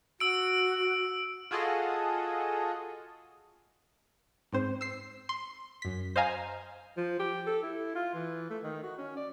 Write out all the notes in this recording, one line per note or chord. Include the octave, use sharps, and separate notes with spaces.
F#4 E6 D7
F4 F#4 G#4 A4 D#5
G#2 C4 C5
E6 C7
C6
F#2 B6
C5 D#5 F5 G#5 A#5
F3
G4
A4
E4
F4
E3
A3
D#3
F#4
C#4
D5